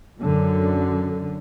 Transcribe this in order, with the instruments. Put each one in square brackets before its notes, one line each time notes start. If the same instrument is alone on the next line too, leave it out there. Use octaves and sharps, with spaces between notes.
[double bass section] F#2 D3